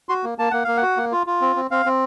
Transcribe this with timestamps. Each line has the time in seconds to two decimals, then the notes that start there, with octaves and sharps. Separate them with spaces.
0.09 F#4 C6
0.24 A#3
0.38 A#3 A5
0.51 A#3 F#5
0.64 A#3 F5
0.77 F#5
0.82 F#4
0.97 A#3
1.12 F4
1.27 F4
1.41 C4
1.56 C4
1.71 C4 F5
1.86 C4